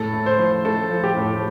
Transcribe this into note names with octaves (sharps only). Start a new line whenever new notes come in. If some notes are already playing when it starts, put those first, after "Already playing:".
Already playing: A2 A4
A3
C5
F3
A3 A4
F3
G4
A2